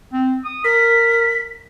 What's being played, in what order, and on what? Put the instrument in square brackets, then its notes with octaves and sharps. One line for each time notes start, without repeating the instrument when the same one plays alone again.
[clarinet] C4
D#6
[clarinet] A#4 [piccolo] B6